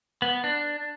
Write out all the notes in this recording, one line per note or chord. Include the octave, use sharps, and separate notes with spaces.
B3
D4